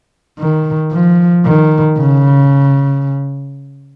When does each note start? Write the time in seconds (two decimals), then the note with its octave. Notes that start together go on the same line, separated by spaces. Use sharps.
0.39 D#3
0.92 F3
1.45 D#3
1.98 C#3